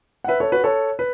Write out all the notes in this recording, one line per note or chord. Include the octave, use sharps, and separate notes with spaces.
F#5
B4 E5
A4 C#5
F#4 B4
A4 C#5
B4